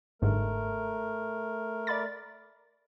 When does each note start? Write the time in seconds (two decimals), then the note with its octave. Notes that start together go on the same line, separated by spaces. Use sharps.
0.22 G1 G#2 A3 A#4
1.87 D5 B5 A6